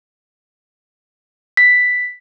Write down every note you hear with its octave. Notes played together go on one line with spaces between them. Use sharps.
B6